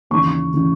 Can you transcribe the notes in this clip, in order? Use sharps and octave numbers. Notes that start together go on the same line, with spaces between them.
D#2 C#3 E3 C#6
C#3 E3